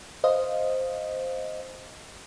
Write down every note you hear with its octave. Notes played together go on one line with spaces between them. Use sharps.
C5 D#5 F5